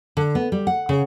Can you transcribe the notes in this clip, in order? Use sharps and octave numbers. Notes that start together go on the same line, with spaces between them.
D3
B3
G3
F#5
C#3